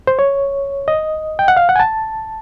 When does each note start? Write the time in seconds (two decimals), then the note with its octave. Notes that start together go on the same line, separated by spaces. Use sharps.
0.07 C5
0.19 C#5
0.88 D#5
1.39 G5
1.48 F#5
1.57 F5
1.69 F#5
1.76 G#5
1.80 A5